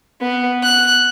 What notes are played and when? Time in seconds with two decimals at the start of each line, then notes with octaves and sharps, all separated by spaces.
0.21 B3
0.63 F#6